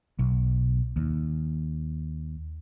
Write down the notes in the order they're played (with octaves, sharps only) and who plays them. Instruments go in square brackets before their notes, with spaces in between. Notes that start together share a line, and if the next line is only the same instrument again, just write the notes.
[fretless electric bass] B1
D#2